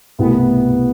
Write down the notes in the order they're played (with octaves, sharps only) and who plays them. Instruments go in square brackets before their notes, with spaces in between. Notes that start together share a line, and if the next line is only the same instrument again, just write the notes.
[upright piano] C2 B2 A3 [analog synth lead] B3